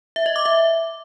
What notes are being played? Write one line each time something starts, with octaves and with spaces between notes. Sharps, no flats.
E5
D#5
D6
E5